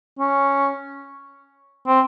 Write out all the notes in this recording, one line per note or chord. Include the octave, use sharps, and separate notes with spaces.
C#4
C4